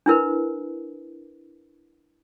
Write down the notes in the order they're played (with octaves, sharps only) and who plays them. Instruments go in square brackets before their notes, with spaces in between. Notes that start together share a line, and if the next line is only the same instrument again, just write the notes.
[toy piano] D4 E4 A#4 B4